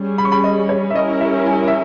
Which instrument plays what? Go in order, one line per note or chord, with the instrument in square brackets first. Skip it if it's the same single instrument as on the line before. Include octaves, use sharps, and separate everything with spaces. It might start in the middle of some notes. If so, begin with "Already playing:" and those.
Already playing: [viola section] G3 C#4 G#4
[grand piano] B5
C#6
B5
D#5
C#5
E5
[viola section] G3 C#4 E4 A#4 [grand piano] D#5
[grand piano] E5
G#5
E5